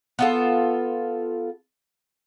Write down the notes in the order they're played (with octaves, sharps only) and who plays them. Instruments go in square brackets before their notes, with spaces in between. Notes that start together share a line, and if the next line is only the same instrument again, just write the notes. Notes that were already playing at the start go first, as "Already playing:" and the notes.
[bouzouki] B3 F4 A4